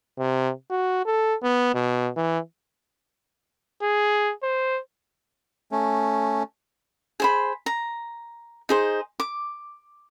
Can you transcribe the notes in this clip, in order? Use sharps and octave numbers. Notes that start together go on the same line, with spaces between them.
C3
F#4
A4
B3
B2
E3
G#4
C5
A3 C#4
G#4 C5 B5
A#5
D#4 G#4 C5
D6